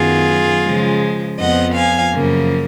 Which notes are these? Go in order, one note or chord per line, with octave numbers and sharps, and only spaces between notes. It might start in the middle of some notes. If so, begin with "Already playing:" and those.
Already playing: F#2 D#3 F#3 B3 F4 G#4
C#3 F3 G#3
F2 F3 B3 D#5 F#5
F5 G#5
F#2 C#3 F3 A#3